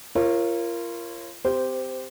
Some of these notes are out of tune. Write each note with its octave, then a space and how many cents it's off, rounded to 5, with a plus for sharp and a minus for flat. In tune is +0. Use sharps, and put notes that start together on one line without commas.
F4 -30 A#4 +0 C#5 -30
C4 -30 G4 +0 C5 -10